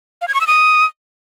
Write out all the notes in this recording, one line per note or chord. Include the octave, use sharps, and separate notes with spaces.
F5
G#6
C#6
E6
D#6